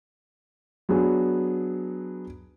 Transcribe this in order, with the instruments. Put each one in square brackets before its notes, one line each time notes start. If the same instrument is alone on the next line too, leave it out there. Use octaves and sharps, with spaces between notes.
[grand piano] F#3 B3 D4 G#4